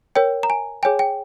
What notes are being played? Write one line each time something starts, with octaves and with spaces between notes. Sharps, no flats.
A#4 C#5 G5
A#5
G#5
G#4 C#5 G5 G#5
G5